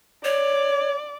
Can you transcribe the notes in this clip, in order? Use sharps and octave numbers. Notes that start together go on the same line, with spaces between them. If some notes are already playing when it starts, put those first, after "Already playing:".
C#5 D5